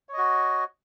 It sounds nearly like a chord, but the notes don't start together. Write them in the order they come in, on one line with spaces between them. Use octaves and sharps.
C#5 D#5 F#4